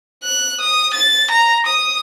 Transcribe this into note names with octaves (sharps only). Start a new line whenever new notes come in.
F#6
D#6
A6
A#5
D#6